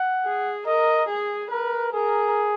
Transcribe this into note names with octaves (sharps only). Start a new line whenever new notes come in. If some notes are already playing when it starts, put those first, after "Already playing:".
Already playing: F#5
G#4
A#4 D#5
G#4
A#4 B4
G#4 A#4